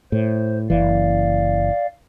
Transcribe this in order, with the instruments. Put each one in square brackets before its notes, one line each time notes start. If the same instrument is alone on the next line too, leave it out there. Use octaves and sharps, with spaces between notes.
[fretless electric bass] A2 [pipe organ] C5
[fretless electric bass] F#1 E3 [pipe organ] D5 F5